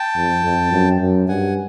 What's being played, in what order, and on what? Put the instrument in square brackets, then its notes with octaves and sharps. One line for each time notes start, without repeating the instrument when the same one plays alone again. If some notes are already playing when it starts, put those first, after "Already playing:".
Already playing: [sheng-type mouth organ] G5 A5
[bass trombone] F2
F2
F#2
F#2
[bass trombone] G2 [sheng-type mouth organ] F#5 G#5